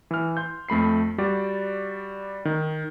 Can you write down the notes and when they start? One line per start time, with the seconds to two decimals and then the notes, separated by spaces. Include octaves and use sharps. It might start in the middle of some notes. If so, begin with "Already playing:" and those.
0.11 E3 F6
0.37 C6 G6
0.68 F2 A3 B5 C7
1.18 G3 F#4 D5
2.45 D#3